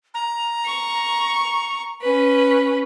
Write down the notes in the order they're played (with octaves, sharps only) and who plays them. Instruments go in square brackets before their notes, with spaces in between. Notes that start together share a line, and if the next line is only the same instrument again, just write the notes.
[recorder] A#5
[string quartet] C#6
C#4 B4